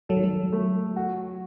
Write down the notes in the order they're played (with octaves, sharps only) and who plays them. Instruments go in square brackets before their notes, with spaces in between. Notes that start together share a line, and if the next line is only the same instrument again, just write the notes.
[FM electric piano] F#3 [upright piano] A4
[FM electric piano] D#3
F#3
[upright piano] A3
F#4